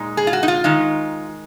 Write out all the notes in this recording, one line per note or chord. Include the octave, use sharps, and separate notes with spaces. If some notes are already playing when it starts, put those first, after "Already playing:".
Already playing: A#2 G#3 D#4
G#4
F4
F#4
D#4
F4
D#3 G#3 D#4